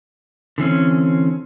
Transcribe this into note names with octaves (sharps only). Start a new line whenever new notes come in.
D3 E3 C4 C#4